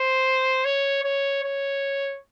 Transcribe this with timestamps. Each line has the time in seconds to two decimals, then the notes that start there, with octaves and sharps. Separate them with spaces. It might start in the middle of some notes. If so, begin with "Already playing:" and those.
Already playing: C5
0.64 C#5
1.03 C#5
1.43 C#5